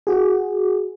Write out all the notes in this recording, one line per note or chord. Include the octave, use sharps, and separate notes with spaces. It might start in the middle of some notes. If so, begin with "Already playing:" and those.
F#4 G#4